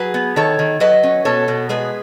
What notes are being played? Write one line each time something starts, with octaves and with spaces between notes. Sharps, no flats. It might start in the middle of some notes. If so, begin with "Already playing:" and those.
Already playing: F#3 G#4 B4
B3
D#3 A4 C#5
D#3
F#3 B4 D#5
C#4
B2 A4 C#5
B2
G#3 G#4 B4